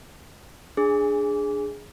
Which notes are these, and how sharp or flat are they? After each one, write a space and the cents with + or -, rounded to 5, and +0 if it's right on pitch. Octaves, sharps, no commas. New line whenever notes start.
D4 +0 G#4 +0